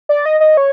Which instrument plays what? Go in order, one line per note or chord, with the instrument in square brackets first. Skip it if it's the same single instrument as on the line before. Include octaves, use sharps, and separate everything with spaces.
[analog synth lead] D5
D#5
D#5
C#5